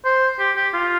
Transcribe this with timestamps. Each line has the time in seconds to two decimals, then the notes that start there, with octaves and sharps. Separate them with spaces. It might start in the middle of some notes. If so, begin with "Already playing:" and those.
0.05 C5
0.39 G4
0.56 G4
0.73 F4